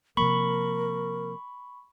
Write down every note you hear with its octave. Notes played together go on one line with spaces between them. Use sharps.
C3 F3 A#3 A#4 B5 C#6